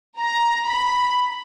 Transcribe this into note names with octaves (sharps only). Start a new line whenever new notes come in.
A#5
B5